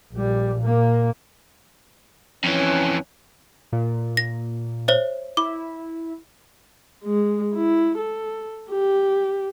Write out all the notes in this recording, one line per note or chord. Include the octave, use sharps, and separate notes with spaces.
A#1 G3
A#2 A#3
F2 E3 C#4
A#2
A#6
C5 C#5 E5
E4 D6
G#3
E4
A4
G4